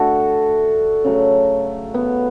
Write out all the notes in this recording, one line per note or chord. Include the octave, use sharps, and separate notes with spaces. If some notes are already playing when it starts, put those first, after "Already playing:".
Already playing: D3 A3 F#4 A4
C#3 F#3 A3
B3